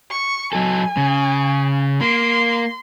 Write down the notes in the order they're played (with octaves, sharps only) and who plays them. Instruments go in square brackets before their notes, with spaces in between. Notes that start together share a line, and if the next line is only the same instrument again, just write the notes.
[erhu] C#6
[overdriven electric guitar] F#3 A4 [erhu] G#5
[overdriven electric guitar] C#3
[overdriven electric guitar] A#3 [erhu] C6